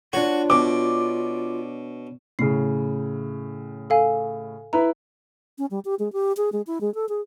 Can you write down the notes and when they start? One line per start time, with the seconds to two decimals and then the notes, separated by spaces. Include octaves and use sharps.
0.13 D4 F4 F#4 C#5
0.50 B2 D6
2.39 A2 C#3 C7
3.90 A4 F5 G#5
4.73 E4 B4 A#5
5.58 C#4
5.71 G3
5.85 G4
5.99 G#3
6.13 G4
6.37 G#4
6.52 G#3
6.67 E4
6.81 G#3
6.95 A4
7.09 G#4